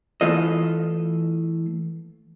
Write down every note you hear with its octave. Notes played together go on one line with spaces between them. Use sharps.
E3 A3 F4 A4 D#5